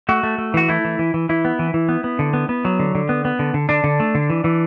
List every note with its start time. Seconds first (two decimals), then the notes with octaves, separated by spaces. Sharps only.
0.09 A3 F#4
0.23 A3
0.38 A3
0.54 E3 F#4
0.68 A3 E4
0.85 E3
0.99 E3
1.14 E3
1.29 E3 E4
1.45 B3
1.59 E3
1.74 E3
1.89 B3
2.04 B3
2.19 D3
2.34 B3
2.49 B3
2.65 F#3
2.79 D3
2.95 D3
3.09 B3
3.25 B3
3.39 D3
3.54 D3
3.69 D3 D4
3.84 D3
4.00 A3
4.15 D3
4.30 E3
4.44 E3